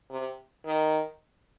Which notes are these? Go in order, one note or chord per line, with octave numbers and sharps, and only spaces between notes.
C3
D#3